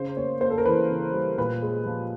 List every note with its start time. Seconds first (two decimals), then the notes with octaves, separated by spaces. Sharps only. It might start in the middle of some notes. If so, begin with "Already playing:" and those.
Already playing: C#3 C5
0.17 A#3 C#5
0.41 A#3 C5
0.50 A4
0.58 A#4
0.66 E3 B4
0.90 C#3
1.13 G3
1.38 A#2 B4
1.62 G#3
1.86 F3